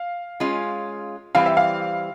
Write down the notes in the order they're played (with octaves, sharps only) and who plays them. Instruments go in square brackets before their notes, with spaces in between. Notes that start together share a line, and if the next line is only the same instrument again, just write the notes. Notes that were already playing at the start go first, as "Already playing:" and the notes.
Already playing: [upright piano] F5
[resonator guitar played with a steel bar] G#3 C#4 F4
[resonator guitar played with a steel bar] E3 G3 C4 [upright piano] F5
[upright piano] E5
F5